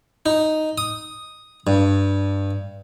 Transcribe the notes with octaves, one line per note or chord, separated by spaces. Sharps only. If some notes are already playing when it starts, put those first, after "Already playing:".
D#4
D#6
G2